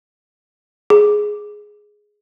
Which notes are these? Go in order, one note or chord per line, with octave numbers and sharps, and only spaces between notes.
G#4